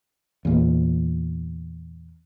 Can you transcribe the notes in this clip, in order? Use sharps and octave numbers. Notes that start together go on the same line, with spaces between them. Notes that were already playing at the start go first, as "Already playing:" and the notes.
E2 A#2